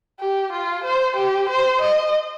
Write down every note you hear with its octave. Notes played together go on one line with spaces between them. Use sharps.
G4
F4
C5
G4
C5
D#5